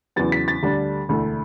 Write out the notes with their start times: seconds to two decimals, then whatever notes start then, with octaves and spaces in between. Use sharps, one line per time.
0.16 E2 C#3 F#3 B3 A6
0.32 B6
0.48 A6
0.62 D2 D3 G3 D4
1.09 E1 D2 D3 A3 E4